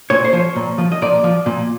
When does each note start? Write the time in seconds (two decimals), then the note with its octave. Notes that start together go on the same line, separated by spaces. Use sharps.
0.10 A#2 C#5
0.24 C5
0.33 F3 C#5
0.56 A#2
0.78 F3
0.92 D#5
1.02 A#2 D5
1.24 F3
1.46 A#2